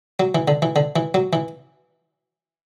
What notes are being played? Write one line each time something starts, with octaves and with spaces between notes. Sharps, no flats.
F#3
E3
D3
E3
D3
E3
F#3
E3